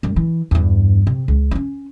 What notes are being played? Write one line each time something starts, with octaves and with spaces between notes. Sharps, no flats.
F#2 G3
E3
E2 G2
C3
C#2
C4 C#4